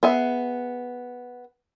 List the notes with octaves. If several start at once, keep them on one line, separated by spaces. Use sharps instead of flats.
B3 G#4 E5